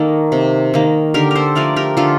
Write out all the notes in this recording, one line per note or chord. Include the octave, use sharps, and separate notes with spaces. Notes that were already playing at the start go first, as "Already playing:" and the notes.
Already playing: D#3 A#3 A4
C3
D#3 A#3
D3 G4 A#4
A4 A#4 C5
F3 A3 A#4 D5
G4 A#4
D3 F4 A4